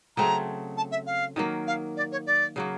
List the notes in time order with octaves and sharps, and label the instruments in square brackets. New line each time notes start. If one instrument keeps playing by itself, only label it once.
[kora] C#3 F#3 A3 C4 [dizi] A#5
[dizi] A5
E5
F5
[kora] D#3 F#3 A#3
[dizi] F5
D5
C#5
D5
[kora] C#3 F#3 A#3